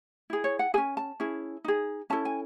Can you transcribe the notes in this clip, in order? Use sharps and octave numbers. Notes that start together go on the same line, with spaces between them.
E4 G#4
C#5
F#5
C#4 G#4 G#5
A5
C#4 E4 G#4
D#4 G#4
C#4 E4 A4 A5
G#5